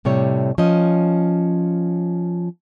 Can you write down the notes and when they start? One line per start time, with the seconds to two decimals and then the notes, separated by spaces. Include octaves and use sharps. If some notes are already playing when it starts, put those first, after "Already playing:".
0.05 A2 C3 G3 C#5
0.58 F3 C#4 D#5